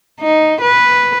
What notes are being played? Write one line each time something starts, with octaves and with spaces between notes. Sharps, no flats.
D#4
B4